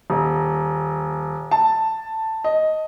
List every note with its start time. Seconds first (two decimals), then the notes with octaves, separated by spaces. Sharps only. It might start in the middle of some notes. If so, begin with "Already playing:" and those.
0.10 D#1
1.51 A5
2.44 D#5